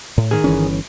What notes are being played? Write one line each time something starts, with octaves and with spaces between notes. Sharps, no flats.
A2
D#3 G#4
G1 E3 C#4